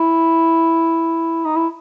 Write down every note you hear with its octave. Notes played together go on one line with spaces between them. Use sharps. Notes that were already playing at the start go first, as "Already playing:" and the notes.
Already playing: E4
D#4
E4